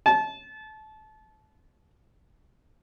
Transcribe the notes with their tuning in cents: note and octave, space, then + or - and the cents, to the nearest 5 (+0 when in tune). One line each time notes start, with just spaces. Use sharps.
A5 -25